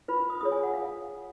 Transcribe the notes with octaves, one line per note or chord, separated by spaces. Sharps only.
F4 B4 B5
D#6
F4 G#4 C#5 D#6
G#5
F#5
F5